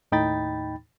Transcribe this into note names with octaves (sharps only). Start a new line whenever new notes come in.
D#2 A2 D#4 G5 B5 A6